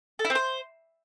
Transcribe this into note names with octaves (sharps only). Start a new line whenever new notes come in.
A4
E4
C4
C5